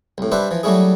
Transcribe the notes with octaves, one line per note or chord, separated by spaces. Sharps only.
C2 A2
G3 D4 B4 C5 E5
E3 F3
F#3 G3 A3 C#4 E4 G#4